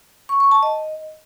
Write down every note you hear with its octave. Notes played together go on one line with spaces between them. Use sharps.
C#6
C#6
A5
D#5